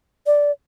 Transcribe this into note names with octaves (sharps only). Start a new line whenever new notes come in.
D5